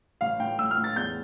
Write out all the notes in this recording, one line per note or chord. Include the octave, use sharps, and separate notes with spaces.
A1 F5
A2 G5
A2 E6
F6
A2
A6
E2 G6